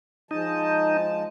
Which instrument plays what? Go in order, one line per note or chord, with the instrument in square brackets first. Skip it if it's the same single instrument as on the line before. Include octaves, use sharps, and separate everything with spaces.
[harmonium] F3 G#3 A5 [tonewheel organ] D#4